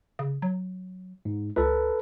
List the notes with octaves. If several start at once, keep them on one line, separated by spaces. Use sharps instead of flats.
C#3
F#3
G#2
C#2 A4 B4